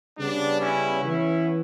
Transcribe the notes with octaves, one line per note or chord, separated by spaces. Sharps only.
C#3 G3 B3 D4
C#4 E4
E3 B3 C#4 E4